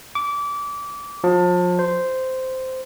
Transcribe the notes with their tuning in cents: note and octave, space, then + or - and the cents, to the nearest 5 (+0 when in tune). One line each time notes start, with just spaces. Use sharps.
D6 -25
F3 +35
C5 -10